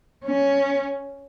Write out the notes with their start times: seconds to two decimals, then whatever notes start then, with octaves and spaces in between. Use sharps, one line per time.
0.25 C#4